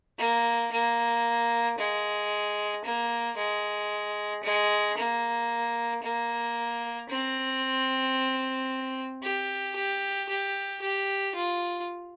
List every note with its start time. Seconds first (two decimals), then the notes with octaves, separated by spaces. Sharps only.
0.18 A#3
0.72 A#3
1.78 G#3
2.84 A#3
3.37 G#3
4.44 G#3
4.97 A#3
6.03 A#3
7.09 C4
9.22 G4
9.76 G4
10.29 G4
10.82 G4
11.35 F4